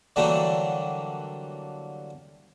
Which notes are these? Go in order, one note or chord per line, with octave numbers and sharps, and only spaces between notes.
D3 E3 F#3 G3 A3 A#3